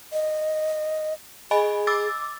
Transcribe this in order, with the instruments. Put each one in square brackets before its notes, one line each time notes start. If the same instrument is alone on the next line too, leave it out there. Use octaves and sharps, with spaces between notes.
[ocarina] D#5
[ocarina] G#4 [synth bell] D#5 G#5 B5
[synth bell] D6 E6 A6